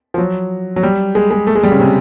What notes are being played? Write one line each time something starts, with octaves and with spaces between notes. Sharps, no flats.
F3
F#3
F#3
G3
G#3
G#3
A3
G#3
G3
C#3
C3